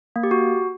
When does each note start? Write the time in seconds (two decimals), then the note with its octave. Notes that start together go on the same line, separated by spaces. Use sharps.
0.16 A#3
0.23 G4
0.31 F#4